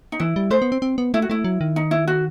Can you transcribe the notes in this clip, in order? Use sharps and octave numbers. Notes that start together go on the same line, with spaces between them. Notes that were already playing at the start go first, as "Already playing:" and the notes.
D#4
E3 E4
G3
A3 C5
B3
C4
C4
B3
A3 E4
F#4
A3 E4
F#3
D#3
D#4
E4
F#4